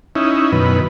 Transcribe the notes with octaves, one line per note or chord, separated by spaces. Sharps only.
C#4 D#4 E4
F#2 B2 D#3 B4